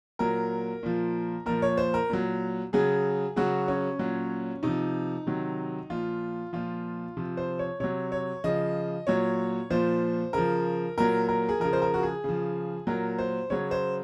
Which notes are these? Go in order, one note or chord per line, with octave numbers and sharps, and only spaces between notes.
A#2 F#3 A#4
A#2 F3
A#2 F3 A#4
C#5
C5
A#4
A#2 F#3
C#3 F#3 G#4
C#3 F#3 F#4
C#4
A#2 F#3
C3 F3 D#4
C3 D#3 F#3
A#2 F3 F4
A#2 F3 F4
C3 F3
C5
C#5
C3 F#3 C#5
C#5
C#3 F3 D#5
A#2 F#3 C#5
A#2 F3 C5
C#3 F3 A#4
A#2 F#3 A#4
A#4
G#4
C#3 F3 A#4
C5
A#4
F#4
G#4
C#3 F3
A#2 F#3 A#4
C5
C#3 F#3 C#5
C5